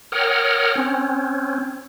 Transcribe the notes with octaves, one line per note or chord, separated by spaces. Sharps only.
A#4 C#5 F#5 G5 D#6 F6
C4 C#4